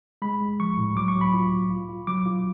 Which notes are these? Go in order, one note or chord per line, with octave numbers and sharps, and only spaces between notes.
G#3 B5
G#3
F3 C#6
A2
F#3 D6
C#6
F#3
B5
F4
F#3
F4
F4
F#3 D6
F4